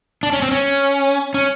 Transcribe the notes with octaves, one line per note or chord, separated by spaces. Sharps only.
D4
C#4
C4
C#4
C#4